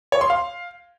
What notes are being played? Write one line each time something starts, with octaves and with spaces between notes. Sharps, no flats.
C#5
C6
F5